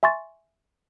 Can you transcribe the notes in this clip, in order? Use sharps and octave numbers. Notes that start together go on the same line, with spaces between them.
E5 G#5 C6 C#6 A6